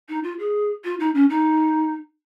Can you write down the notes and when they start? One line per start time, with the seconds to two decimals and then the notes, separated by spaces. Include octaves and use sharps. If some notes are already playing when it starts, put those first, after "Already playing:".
0.09 D#4
0.24 F4
0.39 G#4
0.84 F4
1.00 D#4
1.15 C#4
1.30 D#4